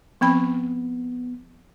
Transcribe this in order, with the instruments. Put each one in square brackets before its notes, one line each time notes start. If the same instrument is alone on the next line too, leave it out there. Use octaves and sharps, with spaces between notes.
[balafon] F3 C4 B5 [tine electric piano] B3